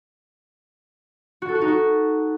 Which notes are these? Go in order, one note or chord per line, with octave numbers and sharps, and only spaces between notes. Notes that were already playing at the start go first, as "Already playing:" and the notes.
F#4
A4
F#4
D#4
F#4